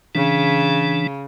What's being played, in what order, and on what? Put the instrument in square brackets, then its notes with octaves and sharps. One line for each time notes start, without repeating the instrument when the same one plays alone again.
[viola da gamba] C#3 [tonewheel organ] E3 D4